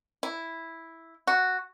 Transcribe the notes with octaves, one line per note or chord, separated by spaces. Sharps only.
E4
F#4